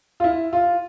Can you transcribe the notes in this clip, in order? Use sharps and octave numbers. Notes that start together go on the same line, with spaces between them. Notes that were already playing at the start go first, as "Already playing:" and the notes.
F4
E4
F4